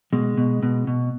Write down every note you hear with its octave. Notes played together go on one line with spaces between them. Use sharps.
B2 G#3
B2
B2
B2